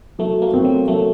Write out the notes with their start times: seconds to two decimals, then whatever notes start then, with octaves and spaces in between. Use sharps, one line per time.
0.19 F#3 A3
0.42 A#3
0.53 C4 F#4
0.65 F#3
0.88 F#3 A3